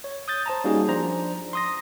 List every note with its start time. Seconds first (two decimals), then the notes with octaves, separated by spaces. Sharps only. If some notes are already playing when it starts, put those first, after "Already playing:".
0.04 C#5
0.28 D#6 G6 A6
0.46 C5 A5 A#5
0.64 G3 A#3 C#4 D#4 F#4 G#4
0.88 F3 D4 C5 D5 A#5
1.53 C6 D#6 A#6